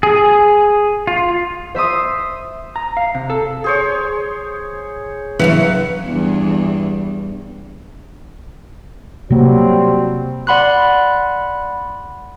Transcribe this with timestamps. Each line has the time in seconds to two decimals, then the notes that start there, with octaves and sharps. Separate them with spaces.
0.03 G#4
1.07 F4
1.75 C5 E5 C6 D#6
2.76 A#5
2.97 F5
3.15 C3
3.30 A4
3.64 G#4 C5 C#5
5.39 F#2 C#3 E3 F#5
6.05 E2 G2
9.30 C3 F#3 G3 A#3 C4
10.47 D5 F#5 B5 C6 F#6